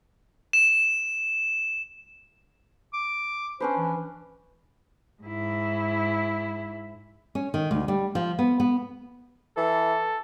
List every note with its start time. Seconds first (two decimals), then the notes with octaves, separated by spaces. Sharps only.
0.53 E7
2.93 D6
3.60 C#4 D4 B4 C5
3.77 E3
5.23 G#2 E4
7.35 C#4
7.54 D#3
7.71 D2
7.88 G3
8.15 F3
8.39 B3
8.60 B3
9.57 E3 A4